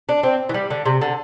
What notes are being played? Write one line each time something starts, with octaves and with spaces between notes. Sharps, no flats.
D4
C4
E3
G3
D3
C3
D3